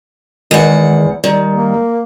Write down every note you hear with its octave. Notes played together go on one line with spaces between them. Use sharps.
E2 D#3 G#3 F#5
D#3 G3
A#3